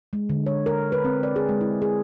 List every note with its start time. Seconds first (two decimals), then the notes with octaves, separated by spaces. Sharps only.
0.13 G#3
0.29 D3
0.46 C#5
0.66 A#4
0.92 B4
1.05 C4
1.23 D5
1.36 G#4
1.49 G#3
1.61 E4
1.82 G#4